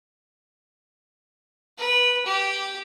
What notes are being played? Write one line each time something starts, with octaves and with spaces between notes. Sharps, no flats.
B4
G4